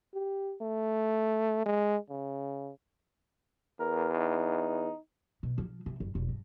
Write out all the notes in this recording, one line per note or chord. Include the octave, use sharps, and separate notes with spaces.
G4
A3
G#3
C#3
E2 A#4
D#4
B2
F3
C3
F#1
E1
G2